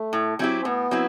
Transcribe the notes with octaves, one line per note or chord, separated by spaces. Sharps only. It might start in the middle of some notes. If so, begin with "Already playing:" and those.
Already playing: A3
A2
F#3 C4 E4 G4
C4
A2 B3
F#3 C4 E4